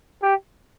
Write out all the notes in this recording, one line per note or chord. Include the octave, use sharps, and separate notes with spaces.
G4